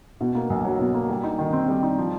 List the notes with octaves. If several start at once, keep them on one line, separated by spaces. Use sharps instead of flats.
B2
A#3
B1
F#3
B2
A#3
G3
D#4
D#3
C4
G3
D#4
F3